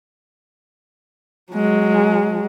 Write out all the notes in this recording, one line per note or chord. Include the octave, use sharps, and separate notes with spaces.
F#3 G#3